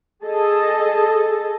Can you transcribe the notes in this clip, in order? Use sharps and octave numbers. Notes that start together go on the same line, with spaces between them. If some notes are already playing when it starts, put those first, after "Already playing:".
G#4 A4 D#5 A5